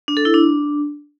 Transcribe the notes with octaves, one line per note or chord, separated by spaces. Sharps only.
D4
A4
E4
D4